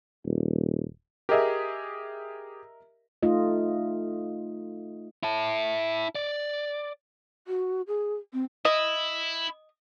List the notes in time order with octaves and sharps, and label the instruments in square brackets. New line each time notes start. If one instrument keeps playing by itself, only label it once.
[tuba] D#1
[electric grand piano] G4 G#4 [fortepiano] A#4 D#5 E5
[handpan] A3 D#4 F4 D#5
[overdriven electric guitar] E4 A5
D5
[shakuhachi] F#4
G#4
C4
[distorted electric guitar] E4 [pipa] D#5